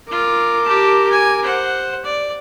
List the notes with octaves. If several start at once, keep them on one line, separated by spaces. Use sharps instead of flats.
F4 A#4 D6
G4 A5
G#5
C5 F#5
D5